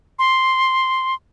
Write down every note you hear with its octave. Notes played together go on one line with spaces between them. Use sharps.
C6